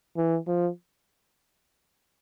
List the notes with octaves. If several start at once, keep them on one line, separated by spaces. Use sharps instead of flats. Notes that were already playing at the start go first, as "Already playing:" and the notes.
E3
F3